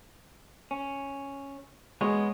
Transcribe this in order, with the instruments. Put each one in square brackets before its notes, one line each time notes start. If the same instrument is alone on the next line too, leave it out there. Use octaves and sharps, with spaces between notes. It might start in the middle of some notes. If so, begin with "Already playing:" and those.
[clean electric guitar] C#4
[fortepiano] G#3 [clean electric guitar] B3 C#5